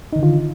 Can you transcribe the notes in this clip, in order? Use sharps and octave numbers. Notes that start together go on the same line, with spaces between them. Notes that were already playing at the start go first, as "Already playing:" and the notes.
D3 D#3 D#4 F4